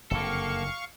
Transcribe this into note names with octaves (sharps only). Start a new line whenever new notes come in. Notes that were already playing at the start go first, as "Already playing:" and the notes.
F#1 F2 D3 A#3 A4 F5 C#6